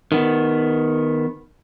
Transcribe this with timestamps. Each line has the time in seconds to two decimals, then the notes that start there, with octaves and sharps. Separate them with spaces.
0.12 D#3 B3